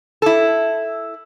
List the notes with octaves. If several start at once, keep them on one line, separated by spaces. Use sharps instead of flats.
E4 A4